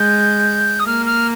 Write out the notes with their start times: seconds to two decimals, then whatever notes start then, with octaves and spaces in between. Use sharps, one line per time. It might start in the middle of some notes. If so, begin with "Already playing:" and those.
Already playing: G#3 G6
0.79 D#6
0.86 A#3 F6
1.06 F6